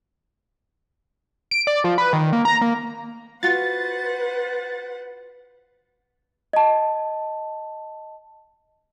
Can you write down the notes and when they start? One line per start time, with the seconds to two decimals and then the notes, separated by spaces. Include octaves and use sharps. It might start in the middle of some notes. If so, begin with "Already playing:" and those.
1.51 D7
1.67 D5
1.84 F3
1.98 B4
2.13 D#3
2.33 A#3
2.45 A#5
2.61 A#3
3.43 F4 F#4 B4 C5 F#5 A6
6.53 D#5 A5